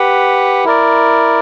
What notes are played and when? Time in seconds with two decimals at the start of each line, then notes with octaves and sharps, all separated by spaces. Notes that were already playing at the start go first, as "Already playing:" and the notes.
Already playing: G4 B4 F#5
0.65 E4 A#4 D5